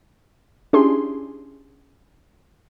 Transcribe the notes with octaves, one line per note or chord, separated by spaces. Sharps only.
C#4 D4 E4 G4 G#4 C6